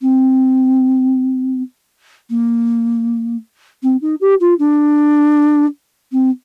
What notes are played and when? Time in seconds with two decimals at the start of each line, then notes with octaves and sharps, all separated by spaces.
0.02 C4
2.30 A#3
3.83 C4
4.01 D#4
4.20 G4
4.40 F4
4.59 D4
6.12 C4